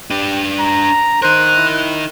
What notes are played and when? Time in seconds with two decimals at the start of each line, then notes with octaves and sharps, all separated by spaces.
0.10 D4 G4 B4
0.59 A#5
1.22 D#4 A#4 C5 F#6
1.57 E4